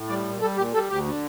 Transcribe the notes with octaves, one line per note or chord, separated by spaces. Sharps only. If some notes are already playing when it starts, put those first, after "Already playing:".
Already playing: A2
G3 D5
A#2
G3 A4
A#2 G4
G3 A4
D2 G4
D3